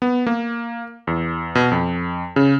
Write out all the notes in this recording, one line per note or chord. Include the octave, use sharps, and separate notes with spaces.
B3
A#3
E2
B2
F2
C#3